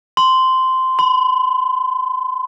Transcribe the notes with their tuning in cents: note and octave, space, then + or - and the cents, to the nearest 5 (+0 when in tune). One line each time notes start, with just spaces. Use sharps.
C6 -10
B5 +45